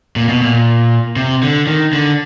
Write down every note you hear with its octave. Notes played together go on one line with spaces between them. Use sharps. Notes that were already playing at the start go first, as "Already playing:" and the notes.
A#2
B2
A#2
C3
D3
D#3
D3